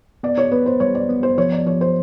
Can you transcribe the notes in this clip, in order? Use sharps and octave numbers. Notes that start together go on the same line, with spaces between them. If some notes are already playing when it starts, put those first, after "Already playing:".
B3 D5
C#5
B3 B4
C5
G3 C#5
D5
B3
C5
F3 C#5
D5
F3 C#5
C5